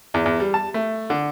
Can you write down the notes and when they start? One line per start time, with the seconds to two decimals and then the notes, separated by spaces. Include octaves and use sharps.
0.14 E2
0.25 E2
0.40 G3
0.54 A5
0.74 A3
1.10 D3